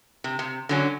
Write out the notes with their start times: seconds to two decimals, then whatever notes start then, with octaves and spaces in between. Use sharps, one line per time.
0.24 C3
0.39 C3
0.69 D3 F#3 C#4